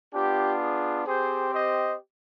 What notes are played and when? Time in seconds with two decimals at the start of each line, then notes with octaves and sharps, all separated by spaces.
0.13 B3 D4 F4 G4
0.60 G#4
1.06 C4 G4 G#4 C5
1.52 C5 D#5